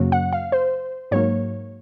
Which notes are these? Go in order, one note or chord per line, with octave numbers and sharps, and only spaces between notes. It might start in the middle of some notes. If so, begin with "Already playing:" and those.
Already playing: F#2 C#3 F#3 A#3
F#5
F5
C5
G#2 F#3 A#3 C#5